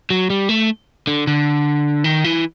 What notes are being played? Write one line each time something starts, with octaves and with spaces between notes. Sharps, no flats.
F#3
G3
A3
D3
D3
D#3
E3